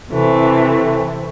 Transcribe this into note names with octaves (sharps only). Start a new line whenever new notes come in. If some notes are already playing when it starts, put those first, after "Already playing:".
C3 E3 A3 C4